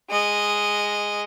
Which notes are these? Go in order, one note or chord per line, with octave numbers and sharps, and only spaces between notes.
G#3 D#5